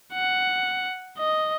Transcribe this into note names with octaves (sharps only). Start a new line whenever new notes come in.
F#5
D#5